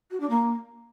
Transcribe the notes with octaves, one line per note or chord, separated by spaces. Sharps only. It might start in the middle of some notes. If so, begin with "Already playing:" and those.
F#4
D4
A#3